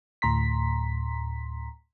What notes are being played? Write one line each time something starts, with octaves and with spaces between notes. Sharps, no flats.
D2 A2 A#5 C6 B6